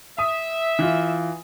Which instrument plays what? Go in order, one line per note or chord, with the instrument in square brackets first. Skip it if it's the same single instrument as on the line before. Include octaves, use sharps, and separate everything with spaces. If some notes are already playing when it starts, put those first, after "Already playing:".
[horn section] E5 [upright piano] D#6
[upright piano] E3 F4